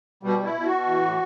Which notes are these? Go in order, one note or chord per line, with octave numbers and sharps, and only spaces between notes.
B2 G3
B2
E4
B2
B2 F#4
E3
A2